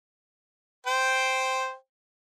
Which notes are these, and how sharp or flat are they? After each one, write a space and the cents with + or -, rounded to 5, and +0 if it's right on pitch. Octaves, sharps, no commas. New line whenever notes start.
C5 +0 G5 +0